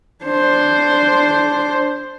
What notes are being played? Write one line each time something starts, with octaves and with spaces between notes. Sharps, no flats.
D4 C5